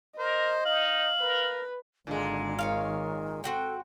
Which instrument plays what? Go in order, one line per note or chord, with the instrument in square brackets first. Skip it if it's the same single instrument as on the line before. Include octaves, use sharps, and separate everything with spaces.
[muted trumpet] A#4 [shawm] C5 [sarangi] D#5
[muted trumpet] D#4 [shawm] F5 [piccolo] F#7
[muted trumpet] A#4 [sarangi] B4
[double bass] G#1 [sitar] A#2 G#3 [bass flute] D3
[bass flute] D#3 [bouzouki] C#5 D5 F5
[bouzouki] C4 F#4 G5 [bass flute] A4